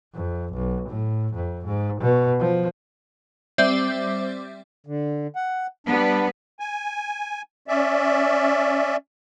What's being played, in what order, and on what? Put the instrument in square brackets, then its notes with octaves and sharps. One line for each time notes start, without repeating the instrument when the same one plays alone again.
[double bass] F2
B1
A2
F2
G#2
B2
F3
[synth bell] G3 C4 C5 D5 E5 D6
[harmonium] D3
F#5
[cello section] G3 B3 [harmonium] D4
[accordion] G#5
C#4 D5 E5